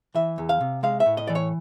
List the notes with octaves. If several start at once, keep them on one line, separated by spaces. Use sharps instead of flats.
E3 E5
E2
F5
C3
G#3 F5
E5
A2
D#5
E3 D5
C#5